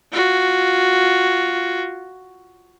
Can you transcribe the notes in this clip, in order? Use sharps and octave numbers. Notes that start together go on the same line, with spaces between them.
F4 F#4